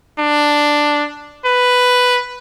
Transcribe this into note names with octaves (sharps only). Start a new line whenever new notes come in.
D4
B4